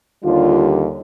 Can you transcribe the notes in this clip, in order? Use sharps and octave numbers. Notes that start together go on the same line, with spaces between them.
D#2 D3 G3 F4